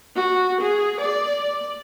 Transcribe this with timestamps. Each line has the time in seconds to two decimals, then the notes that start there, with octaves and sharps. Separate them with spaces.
0.16 F#4
0.60 G#4
1.00 D5